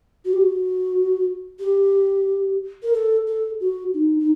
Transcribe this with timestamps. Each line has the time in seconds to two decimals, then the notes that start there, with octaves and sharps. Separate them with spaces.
0.25 F#4
0.33 G4
0.41 F#4
1.60 G4
2.83 A#4
2.94 A4
3.27 A4
3.60 F#4
3.94 D#4
4.20 D#4